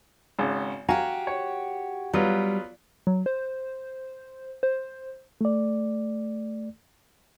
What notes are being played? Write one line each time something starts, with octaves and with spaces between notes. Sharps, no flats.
G#1 C#3
F#4 G4 F5 G#5 A#5
C#5
F#3 G3 B3 F4
F#3
C5
C5
A3 D5